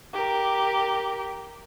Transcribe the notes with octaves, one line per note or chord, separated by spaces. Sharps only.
G4 A#4